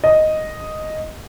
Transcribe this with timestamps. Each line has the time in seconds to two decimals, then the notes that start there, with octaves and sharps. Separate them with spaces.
0.04 D#5